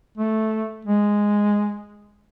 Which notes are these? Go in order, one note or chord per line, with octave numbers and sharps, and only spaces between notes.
A3
G#3